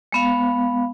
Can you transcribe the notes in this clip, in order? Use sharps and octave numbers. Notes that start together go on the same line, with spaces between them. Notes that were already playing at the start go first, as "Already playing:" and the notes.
G#3 B3 F5